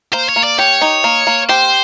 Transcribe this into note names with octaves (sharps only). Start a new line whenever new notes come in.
A#3 C5
C#5
A#3
D5
G4 C#5
D#4
A#3
A#3
G4 C5